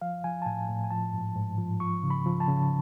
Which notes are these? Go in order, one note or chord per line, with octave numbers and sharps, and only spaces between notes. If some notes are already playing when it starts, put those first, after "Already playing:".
F3 F5
F3 G#5
A5
A2 G#5
A2
G#5
F3 A5
G#2
G#2
F3
F3 C#6
C#3
B5
F3
A5
C#3